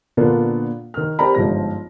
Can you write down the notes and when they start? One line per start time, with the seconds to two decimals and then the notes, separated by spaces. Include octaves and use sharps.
0.17 A#2 D3 A#3 B3 D4 F4
0.94 D#3 F6
1.19 C4 G4 A#4 D5 A#5 B5
1.35 G1 G#2 F3 A#6